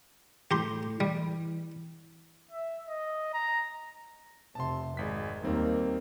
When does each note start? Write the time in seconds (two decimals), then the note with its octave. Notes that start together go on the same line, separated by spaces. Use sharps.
0.51 A2 G4 A#5 C6
1.00 E3 G3
2.51 E5
2.89 D#5
3.33 A#5
4.55 F1 C3 A5 C6
4.97 G#1 G#3 B6
5.44 D#2 G3 A#3 C4 D#4